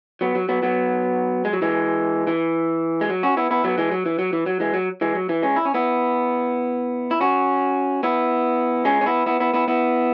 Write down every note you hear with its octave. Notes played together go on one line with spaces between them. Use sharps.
F#3 B3
F#3
F#3 B3
F#3 B3
G#3
F#3
E3 G#3
E3
G#3
F#3
C#4 F#4
B3 E4
B3 E4
F#3 B3
E3 G#3
F#3
E3
F#3
E3
F#3
E3 G#3
F#3
E3 G#3
F#3
E3
G#3 C#4
E4
C#4
B3 E4
E4
C#4 F#4
B3 E4
G#3 C#4
C#4
B3 E4
B3 E4
B3 E4
B3 E4
B3 E4